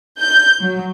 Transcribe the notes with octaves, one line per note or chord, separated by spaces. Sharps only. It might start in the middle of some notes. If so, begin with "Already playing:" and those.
G6
F#3